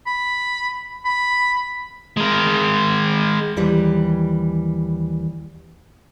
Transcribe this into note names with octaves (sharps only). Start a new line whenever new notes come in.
B5
B5
G#3 A#4
D#2 E3 G3